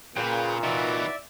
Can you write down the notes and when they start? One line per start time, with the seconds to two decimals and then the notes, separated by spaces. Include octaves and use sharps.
0.17 A#2 C#3 G#4 B4 G5
0.63 C3 E3 D#4 F#4 B4 D5 E5